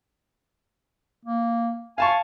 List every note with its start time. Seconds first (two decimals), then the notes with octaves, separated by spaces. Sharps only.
1.25 A#3
1.98 F5 G#5 A5 C#6